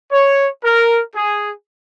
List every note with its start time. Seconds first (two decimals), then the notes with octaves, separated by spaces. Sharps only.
0.12 C#5
0.64 A#4
1.15 G#4